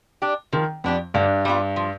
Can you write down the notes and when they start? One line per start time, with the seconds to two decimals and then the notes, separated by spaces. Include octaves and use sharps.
0.22 D4 G4
0.53 D#3 F3
0.84 F2 B3 D4 G4
1.14 G2 D3
1.45 G3 B3 F4
1.76 F3